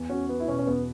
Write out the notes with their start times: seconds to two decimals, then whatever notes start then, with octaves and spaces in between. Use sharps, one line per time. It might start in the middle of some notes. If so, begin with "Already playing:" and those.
Already playing: E2
0.09 C#4 F#4
0.29 B3
0.40 E4
0.48 B2 C#4
0.58 C#4
0.67 E2 B3